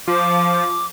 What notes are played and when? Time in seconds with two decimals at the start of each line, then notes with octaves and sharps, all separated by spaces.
0.07 F3 D6